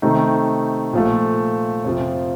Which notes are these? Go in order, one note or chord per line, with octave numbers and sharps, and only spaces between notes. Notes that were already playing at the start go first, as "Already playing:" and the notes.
C3 D#3 A3 D#4
A#2 F3 A3
F2 C3 F3